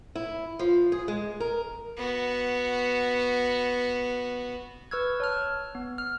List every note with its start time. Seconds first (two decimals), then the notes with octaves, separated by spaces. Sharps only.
0.15 E4
0.59 F3
0.92 G#4
1.08 G#3
1.40 A#4
1.97 B3 F#4
4.91 B4 C#6 E6 F6 G#6
5.20 C#5 A5 F6
5.75 B3
5.98 F6